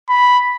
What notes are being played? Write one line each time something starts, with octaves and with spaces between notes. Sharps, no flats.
B5